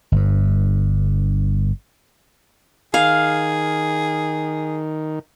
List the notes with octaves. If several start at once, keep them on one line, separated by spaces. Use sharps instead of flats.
G1 G2
D#3 G#4 F5